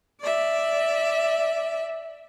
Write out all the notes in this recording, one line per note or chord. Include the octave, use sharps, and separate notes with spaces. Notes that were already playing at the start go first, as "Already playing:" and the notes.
D5 E5